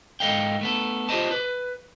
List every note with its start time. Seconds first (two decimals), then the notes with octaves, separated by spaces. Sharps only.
0.20 G#2 A4 D#5 F5 G5
0.61 A3 B3 A4
1.09 F4 G4 C5 D#5 A5
1.31 B4